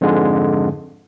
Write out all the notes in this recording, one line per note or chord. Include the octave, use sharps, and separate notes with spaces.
F2 G#2 D3 G#3